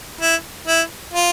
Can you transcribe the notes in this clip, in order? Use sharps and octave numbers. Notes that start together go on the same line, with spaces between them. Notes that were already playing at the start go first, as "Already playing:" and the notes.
E4
E4
F4